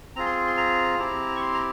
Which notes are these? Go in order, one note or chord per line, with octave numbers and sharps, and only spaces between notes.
C4 F4 G#4 A#5
C6
C6
A#5
C4 E4 G4 A#5
C#6
C6
A#5